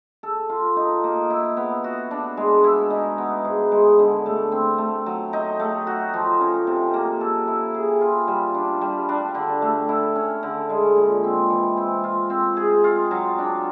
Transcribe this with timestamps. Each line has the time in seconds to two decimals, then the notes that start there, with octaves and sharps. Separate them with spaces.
0.23 A4
0.49 F4
0.76 D#4
1.04 A#3
1.30 E4
1.57 B3
1.84 F#4
2.11 D4
2.37 G#3
2.64 E4
2.90 D#4
3.18 B3
3.45 G#2
3.72 G#3
3.99 D3
4.26 A3
4.52 C4
4.78 A3
5.06 F#3
5.33 D#4
5.60 A3
5.87 F#4
6.14 F3
6.40 C#4
6.67 C3
6.94 A#3
7.21 A4
7.48 E4
7.74 G#4
8.01 F4
8.28 G3
8.55 D4
8.82 G3
9.09 D4
9.35 D3
9.62 A3
9.89 E4
10.15 C#4
10.43 D3
10.70 G#3
10.97 A#2
11.24 C4
11.50 E3
11.77 C4
12.04 F4
12.30 C4
12.57 G#4
12.84 F4
13.11 F#3
13.38 D4